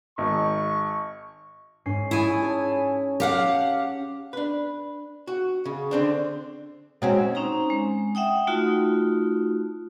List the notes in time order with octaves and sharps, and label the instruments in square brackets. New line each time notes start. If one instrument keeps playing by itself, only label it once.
[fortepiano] G#1 [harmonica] C#6
[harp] G#2 C#4 C7
[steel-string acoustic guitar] E4 G#5 [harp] C#6 D#6 A6
[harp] G#4 C#5 A5
[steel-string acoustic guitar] G4 F5 F#5
[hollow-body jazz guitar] D4 B4
F#4
C#3
D3 C4 D4
[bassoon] F#3 [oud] G#3 C4 C#4
[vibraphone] C4 C#4 D#4 C5 A#5
G#3
E5 F#5 G5 D#6
A3 D#4 F4 F#4